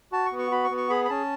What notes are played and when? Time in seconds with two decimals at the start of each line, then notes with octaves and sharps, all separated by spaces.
0.12 F#4 A5
0.26 C#6
0.32 B3
0.39 C#6
0.51 F#4 B5
0.64 C#6
0.71 B3
0.77 C#6
0.90 G#4 B5
1.05 B5
1.09 C#4 A5